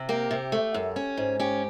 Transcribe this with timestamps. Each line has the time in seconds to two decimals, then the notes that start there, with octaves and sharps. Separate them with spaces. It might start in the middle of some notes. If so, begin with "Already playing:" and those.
Already playing: C3
0.09 A#3 G4
0.31 C3
0.52 A3
0.74 F#2
0.96 C#4
1.17 G#2
1.40 C#4 G4